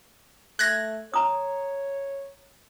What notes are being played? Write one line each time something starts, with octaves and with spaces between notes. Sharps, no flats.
A3 F#6 G#6 A#6
C#5 A#5 D#6